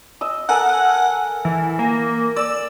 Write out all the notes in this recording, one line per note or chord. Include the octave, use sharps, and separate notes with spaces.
D#5 E6
A4 A#4 F#5 G#5
E3
A#3
D5 E6